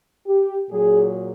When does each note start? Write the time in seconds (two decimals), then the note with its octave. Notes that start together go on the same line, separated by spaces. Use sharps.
0.26 G4
0.70 A#2 F#3 G#4